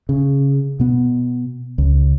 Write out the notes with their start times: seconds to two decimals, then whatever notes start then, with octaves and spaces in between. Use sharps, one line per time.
0.09 C#3
0.80 B2 B3
1.78 C#2